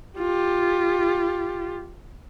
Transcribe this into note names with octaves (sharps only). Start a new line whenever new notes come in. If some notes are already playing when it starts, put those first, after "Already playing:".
F4 G4